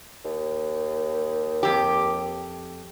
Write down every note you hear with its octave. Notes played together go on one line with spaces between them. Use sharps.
D#2
F2 G4